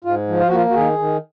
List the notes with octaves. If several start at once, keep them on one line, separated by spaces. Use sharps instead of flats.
G#2 F4
F3
F4
F#4
A#3
F4
F#4
D#3 G#4
D#3